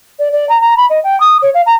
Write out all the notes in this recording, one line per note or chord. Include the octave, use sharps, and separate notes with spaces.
D5
D5
A#5
A#5
B5
D#5
G5
D#6
C#5
F5
A#5